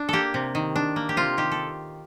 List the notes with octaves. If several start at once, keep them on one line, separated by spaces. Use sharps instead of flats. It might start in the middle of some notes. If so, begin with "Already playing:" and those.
Already playing: D4
A#3 G4 A4
C3
D#3
D4
A#3
G4
C3 F4
D#3 G4
A4